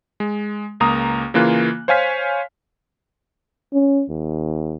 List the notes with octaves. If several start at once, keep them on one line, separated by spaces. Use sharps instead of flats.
G#3
C#2 A#3 A#5 D#6
C#3 E3 A#3 F4 F#6
C5 C#5 F5 G#5 F6 B6
C#4
D#2